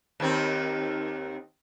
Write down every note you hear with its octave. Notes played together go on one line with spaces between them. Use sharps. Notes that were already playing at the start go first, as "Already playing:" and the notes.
D#2 D#3 C4